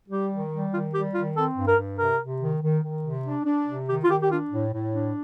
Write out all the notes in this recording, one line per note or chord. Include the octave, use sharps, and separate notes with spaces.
G3 G4
D#3
G3
D#3 F4
G3 G4
D#3 F4
C4 A4
G2
A#4
G2
C3 A#4
C3
D#3
D#3
D#3
C3
D4
D4
C3
D#3 G4
F4
D#3 G4
G4
D4 F4
A2
A2
D4